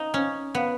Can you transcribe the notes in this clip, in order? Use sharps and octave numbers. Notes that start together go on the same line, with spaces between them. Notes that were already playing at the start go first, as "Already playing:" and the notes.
Already playing: D#4
C#4
B3